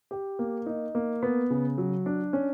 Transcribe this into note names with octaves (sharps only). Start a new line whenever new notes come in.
G4
A#3
D#4
A#3
B3
C#3
F#3
D4
C#4